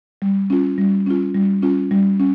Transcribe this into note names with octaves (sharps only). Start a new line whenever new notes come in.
G3
C#4 F4
G3
C#4 F4
G3
C#4 F4
G3
C#4